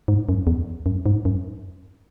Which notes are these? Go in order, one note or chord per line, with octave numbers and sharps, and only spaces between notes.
G#2
F#2
E2
F#2
G#2
F#2